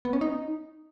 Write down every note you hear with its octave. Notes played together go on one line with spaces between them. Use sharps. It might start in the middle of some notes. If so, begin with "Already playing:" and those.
B3
C#4
D#4